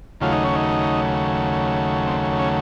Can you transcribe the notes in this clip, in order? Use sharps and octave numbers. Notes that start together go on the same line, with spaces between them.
D#2 C#3 F#3 A3 F4
D#4
C#4
D#4
C4
C#4